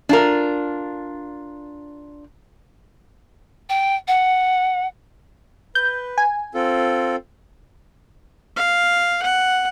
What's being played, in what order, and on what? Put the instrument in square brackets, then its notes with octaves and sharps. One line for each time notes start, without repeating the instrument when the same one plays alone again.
[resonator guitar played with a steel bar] D4 F4 A#4
[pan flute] G5
F#5
[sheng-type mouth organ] B4 [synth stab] G6
[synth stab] G#5
[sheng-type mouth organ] C4 F4 A4
[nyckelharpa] F5
F#5